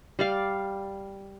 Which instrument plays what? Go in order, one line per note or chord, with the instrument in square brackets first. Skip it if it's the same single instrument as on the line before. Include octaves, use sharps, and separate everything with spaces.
[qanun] G3 D5 F5